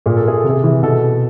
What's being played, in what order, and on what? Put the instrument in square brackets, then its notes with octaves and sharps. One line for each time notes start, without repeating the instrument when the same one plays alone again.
[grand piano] A#2 G#4
A4
G#4
C3 A4
G#4
E3
B2 A4